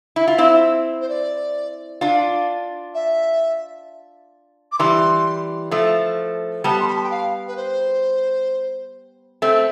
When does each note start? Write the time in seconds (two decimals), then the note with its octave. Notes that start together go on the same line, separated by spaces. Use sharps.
0.16 E4
0.28 F4
0.38 C4 E4
1.01 C5
1.09 D5
2.01 D4 F4
2.94 E5
4.72 D6
4.79 E3 G3 C6
5.71 F3 A3
6.64 G3 B3 A5
6.80 C6
6.88 B5
6.95 A5
7.03 G5
7.11 F5
7.48 B4
7.56 C5
9.42 A3 C4